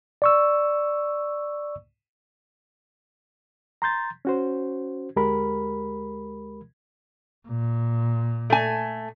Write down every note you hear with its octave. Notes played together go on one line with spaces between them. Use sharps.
D5 C#6 E6
A#5 C6 G6 A6
C#4 F#4 C5
D2 G#3 G4 A#4 B5
A#2
A3 G#5